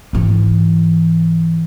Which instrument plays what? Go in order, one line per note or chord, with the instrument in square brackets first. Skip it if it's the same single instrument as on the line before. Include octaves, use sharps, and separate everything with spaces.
[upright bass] G#2 E3